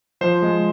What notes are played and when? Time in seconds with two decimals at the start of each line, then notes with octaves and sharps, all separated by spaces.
0.21 F3 C5
0.42 G#3